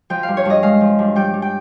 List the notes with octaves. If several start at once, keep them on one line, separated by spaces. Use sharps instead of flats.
F3 G5
G2 F5
C#5
G2 D#5
G#3 F5
F3
G2
G3 G5
G3
G5